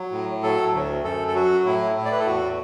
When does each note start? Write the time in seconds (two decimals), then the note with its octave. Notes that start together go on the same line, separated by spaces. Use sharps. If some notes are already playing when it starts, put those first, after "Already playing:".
Already playing: F#3
0.11 A2
0.43 F#3 A4
0.74 D2
1.04 F#2 A4
1.28 A4
1.35 F#3 F#4
1.65 A2 E4
1.96 A2 E4
2.05 D5
2.12 B4
2.19 A4
2.26 E2 F#4